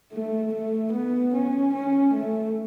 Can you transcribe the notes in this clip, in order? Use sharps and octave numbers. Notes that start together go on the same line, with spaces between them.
A3
A3
B3
C#4
C#4
A3